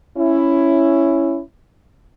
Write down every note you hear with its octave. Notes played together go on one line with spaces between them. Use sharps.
C#4 E4